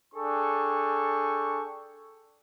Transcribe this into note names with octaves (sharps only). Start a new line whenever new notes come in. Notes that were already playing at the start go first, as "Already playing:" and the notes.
D4 G#4 A4 G5 C#6